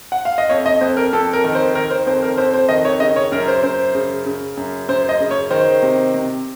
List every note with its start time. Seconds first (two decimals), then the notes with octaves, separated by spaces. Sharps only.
0.12 F#5
0.25 F5
0.38 D#5
0.49 F2 C#5
0.66 D#5
0.81 F2 C5
0.97 A#4
1.13 F2 A4
1.33 A#4
1.44 D#3
1.55 C5
1.75 D#3 A#4
1.91 C5
2.07 F2 C5
2.22 A#4
2.37 F2 C5
2.54 C5
2.69 D#3 D#5
2.85 C#5
3.00 C#3 D#5
3.16 C#5
3.32 F#2 A#4
3.48 C5
3.63 F#2 C5
3.95 C#3
4.26 C#3
4.57 F#2
4.89 F#2 C5
5.09 D#5
5.20 C#3
5.31 C#5
5.51 D#3 C5
5.82 C3
6.14 C3